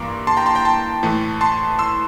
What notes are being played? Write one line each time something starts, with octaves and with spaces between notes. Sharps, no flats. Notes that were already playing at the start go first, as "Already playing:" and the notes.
Already playing: G2 E3 A#3 A#5 C6 D6 E6
A5 C6
G5 A#5
A5 C6
G5 A#5
A5 C6
A2 E3 A3
A5 C6
C6 E6